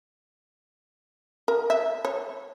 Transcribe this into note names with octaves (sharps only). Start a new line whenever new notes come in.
A#4
E5
C#5